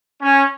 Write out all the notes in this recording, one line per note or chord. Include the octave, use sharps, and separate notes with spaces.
C#4